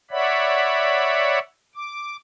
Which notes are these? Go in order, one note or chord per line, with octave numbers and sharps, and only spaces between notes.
C#5 D5 E5 F#5 B5
D6